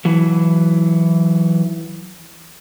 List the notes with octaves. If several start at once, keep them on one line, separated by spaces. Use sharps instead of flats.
E3 F#3